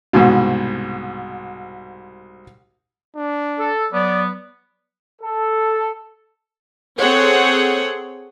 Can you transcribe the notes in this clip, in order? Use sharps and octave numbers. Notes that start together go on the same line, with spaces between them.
C2 G#2 B2
D4
A4
F#3 B3 D5
A4
C4 G#4 A4 C5 C#5 F#5